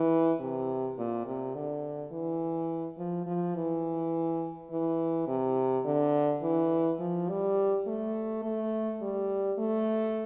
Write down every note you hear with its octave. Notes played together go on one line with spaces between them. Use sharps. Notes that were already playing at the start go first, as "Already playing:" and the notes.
Already playing: E3
C3
A#2
C3
D3
E3
F3
F3
E3
E3
C3
D3
E3
F3
G3
A3
A3
G3
A3